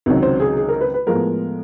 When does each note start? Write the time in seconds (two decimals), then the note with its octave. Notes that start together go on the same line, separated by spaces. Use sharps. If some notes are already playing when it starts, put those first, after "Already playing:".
0.06 C#2 C3 D#3 F#3
0.23 C5
0.40 G#4
0.57 G#4
0.69 A#4
0.81 B4
0.94 B4
1.07 A2 F3 G#3 B3 A#4